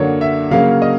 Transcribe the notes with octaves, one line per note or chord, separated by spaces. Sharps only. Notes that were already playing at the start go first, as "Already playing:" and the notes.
Already playing: F#2 D3 F#3 A#3 C#5
E5
C#3 F#3 A#3 C#4 F5
D#5